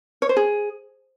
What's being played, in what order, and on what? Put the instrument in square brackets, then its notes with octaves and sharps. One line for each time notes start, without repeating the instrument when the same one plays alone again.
[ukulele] C#5
C5
G#4